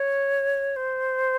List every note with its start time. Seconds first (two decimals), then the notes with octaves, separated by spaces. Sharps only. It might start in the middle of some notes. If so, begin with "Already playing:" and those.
Already playing: C#5
0.76 C5